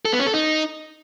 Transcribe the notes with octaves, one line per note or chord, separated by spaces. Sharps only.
A4
B3
C#4
A4
D#4